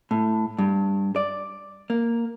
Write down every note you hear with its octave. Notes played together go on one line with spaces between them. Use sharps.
A2
G2
D5
A#3